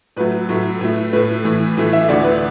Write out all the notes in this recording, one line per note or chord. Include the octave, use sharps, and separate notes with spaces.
A2 F#3 A3 B4
A2 F#3 A3
A2 A3
A2 A3 B4
A2 E3 A3
A2 E3 A3
E5
D2 D3 A3 D5
B4